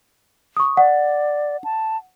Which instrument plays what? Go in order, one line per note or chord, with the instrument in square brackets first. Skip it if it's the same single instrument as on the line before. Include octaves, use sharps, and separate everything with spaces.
[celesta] C#6 D#6
[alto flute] D5 [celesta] F#5
[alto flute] A5